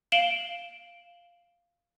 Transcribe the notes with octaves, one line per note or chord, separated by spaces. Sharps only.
F5 D7 E7 F#7 G7